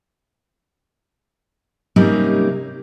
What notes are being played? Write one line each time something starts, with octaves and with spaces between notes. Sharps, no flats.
C3 G3 A#3 C4 C#4 D#4